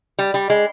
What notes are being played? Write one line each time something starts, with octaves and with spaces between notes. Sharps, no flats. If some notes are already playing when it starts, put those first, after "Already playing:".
G3
G3
G#3